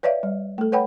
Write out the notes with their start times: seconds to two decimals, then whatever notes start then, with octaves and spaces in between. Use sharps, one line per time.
0.03 B4 C#5 D5 E5 F5
0.23 G3
0.58 A3 A4
0.72 B4 C#5 F#5 G5 B5